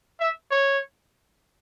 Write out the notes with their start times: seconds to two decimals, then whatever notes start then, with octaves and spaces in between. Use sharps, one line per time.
0.20 E5
0.51 C#5